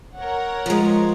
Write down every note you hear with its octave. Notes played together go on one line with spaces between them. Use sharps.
A#4 C#5 F#5
F3 G#3